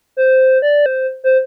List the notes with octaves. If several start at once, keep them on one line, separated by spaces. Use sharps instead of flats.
C5
D5
C5
C5